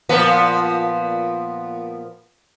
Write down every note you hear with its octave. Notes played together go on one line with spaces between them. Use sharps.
A#2 F3 B3